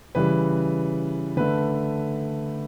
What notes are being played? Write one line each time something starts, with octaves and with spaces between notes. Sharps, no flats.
C#3 E3 G3 B4
D3 A3 B4